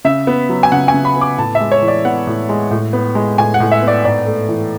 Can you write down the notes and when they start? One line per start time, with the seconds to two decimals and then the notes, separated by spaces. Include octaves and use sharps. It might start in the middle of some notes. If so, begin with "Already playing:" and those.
0.05 C#3 E5
0.27 B3
0.49 F#3
0.63 G#5
0.72 C#3 F#5
0.88 G#5
0.94 C#3
1.05 B5
1.16 B3
1.21 D6
1.38 A2 A5
1.55 E5
1.60 G#3
1.72 C#5
1.82 E3
1.88 D5
2.05 B3 F#5
2.27 A2
2.49 G#3
2.71 A2
2.93 B3
3.15 G#3
3.38 A2 G#5
3.54 F#5
3.60 A2
3.72 E5
3.82 B3
3.88 D5
4.04 G#2 D5
4.26 A3
4.49 E3